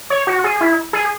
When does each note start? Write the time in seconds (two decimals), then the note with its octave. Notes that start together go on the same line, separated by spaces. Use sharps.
0.10 C#5
0.27 F#4
0.44 G#4
0.61 E4
0.93 G#4